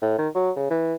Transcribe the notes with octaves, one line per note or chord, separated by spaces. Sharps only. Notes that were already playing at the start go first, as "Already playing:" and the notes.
A2
D#3
F#3
C#3
E3